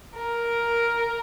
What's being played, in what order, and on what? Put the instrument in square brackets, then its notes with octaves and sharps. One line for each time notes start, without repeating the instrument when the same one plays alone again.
[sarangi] A#4